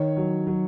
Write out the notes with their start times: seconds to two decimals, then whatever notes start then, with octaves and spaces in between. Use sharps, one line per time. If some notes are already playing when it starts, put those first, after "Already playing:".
Already playing: D#3 C#5
0.17 F#3
0.47 F#3